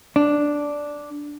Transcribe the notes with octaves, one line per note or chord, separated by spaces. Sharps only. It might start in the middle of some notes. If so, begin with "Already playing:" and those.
D4